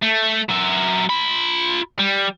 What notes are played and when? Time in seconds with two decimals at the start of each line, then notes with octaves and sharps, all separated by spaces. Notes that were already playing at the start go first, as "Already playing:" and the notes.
0.02 A3
0.49 F#3 E5
1.10 F4 B5
1.99 G3